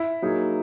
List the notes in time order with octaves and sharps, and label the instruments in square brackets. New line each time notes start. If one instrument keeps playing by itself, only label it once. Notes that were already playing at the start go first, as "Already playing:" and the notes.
Already playing: [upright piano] E4
[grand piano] F#3 A#3 D#4 G#4